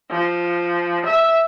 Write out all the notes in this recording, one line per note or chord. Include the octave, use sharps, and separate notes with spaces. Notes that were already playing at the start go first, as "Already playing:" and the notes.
F3
E5